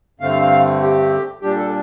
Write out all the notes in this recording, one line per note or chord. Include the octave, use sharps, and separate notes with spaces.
G2 D3 A3 C4 F5
G4
A#2 G3 D4 G4
A4